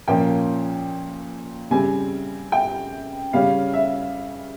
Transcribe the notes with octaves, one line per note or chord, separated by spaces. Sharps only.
A#2 F3 A#3 C#4 G5
C#3 G3 C4 G#5
G5
C#3 G3 C#4 F5
E5